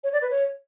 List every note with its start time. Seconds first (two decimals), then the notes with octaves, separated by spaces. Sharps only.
0.04 C#5
0.13 D5
0.22 B4
0.31 C#5